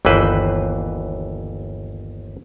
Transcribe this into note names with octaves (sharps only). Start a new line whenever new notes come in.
G1 D#2 E3 B4 C5